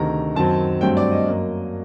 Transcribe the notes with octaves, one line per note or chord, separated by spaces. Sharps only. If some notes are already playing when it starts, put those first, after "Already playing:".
Already playing: D2 C3 D#3 A#5
F#2 D#3 F#3 C4 A5
G2 F#3 A3 C4 G5
D5
D#5
F#2 F#3 A#3